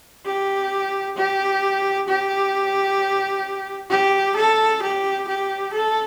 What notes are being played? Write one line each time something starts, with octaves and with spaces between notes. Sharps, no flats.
G4
G4
G4
G4
A4
G4
G4
A4